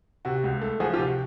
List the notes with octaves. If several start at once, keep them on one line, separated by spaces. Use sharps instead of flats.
C3 F#4
C#2
A3
F3 F#4 G#4
F4 G4
C3
F#4